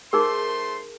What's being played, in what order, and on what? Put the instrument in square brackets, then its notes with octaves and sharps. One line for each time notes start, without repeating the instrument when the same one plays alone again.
[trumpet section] A3 C5 C6 [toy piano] D#4 G#4 A#4